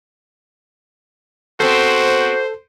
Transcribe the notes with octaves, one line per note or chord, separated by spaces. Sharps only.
B3 C4 F#4 A4 C5